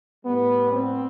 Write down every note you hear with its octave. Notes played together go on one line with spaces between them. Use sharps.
A2 G3 B3
C4